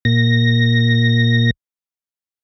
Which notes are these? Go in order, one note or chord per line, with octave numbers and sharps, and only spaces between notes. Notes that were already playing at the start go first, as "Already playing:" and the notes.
A#2 A#6